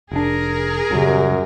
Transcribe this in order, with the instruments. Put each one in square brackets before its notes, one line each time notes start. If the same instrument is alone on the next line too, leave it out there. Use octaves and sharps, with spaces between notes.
[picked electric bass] F1 D4 [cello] G#4 A#4
[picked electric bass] D#1 C#3 [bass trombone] F#2 [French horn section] G3